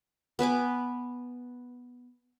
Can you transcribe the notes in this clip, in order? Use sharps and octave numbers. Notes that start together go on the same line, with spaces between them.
B3 B4 G#5 D6